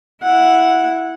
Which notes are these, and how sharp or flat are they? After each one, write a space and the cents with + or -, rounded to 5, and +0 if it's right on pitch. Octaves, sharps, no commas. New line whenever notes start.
E4 +0 F#5 -10